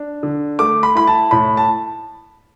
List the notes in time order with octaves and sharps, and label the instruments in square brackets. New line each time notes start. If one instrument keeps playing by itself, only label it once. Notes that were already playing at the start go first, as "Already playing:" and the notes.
Already playing: [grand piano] D4
D3
A3 D6
B5
E4 B5
A5
A2 B5
A5